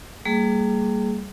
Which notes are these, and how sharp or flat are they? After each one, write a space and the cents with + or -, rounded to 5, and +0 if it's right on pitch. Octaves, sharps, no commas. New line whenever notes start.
G3 +0 A#3 -30 G#4 +20